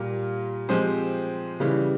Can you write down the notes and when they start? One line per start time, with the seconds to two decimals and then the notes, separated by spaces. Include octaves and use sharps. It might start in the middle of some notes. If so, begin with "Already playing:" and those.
Already playing: A#2 G3 A#3 F4
0.69 F3 G#3 C4 G4 C5
1.60 C#3 E3 G3